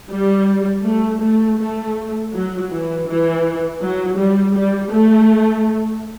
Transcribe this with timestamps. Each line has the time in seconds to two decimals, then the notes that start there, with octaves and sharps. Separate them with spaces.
0.11 G3
0.85 A3
1.22 A3
1.59 A3
2.33 F#3
2.71 E3
3.07 E3
3.82 F#3
4.18 G3
4.55 G3
4.92 A3